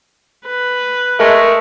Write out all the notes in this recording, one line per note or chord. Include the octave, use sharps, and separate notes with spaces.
B4
G#3 A3 A#4